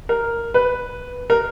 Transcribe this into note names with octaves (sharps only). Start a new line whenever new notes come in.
A#4
B4
A#4